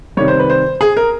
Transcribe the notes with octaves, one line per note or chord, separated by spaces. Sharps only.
C3 D#3 G3 C#5
C5
B4
C5
G#4
A#4